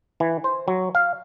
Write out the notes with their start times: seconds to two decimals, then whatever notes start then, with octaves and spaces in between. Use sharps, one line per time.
0.20 E3
0.44 C5
0.68 F#3
0.95 F5